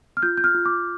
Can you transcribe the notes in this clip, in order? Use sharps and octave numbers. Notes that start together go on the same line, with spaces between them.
F6
F4 G6
G6
F6
F4
D6